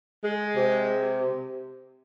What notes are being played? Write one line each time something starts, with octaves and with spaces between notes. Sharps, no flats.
G#3
C3